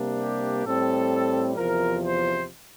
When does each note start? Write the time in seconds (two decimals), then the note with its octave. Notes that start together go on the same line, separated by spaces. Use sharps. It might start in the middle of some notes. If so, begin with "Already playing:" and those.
Already playing: C3 G3 A#3 D4
0.20 G4
0.65 A2 G3 C4 A4
1.57 E2 C3 F3 A#4
2.02 C5